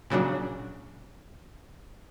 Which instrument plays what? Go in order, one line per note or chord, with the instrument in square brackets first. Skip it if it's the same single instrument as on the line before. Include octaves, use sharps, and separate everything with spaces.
[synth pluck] A#2 C#3 F#3 D4